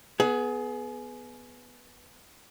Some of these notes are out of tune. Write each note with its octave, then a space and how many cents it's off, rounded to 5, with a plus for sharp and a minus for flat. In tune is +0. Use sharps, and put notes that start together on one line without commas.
B3 +0 G#4 +25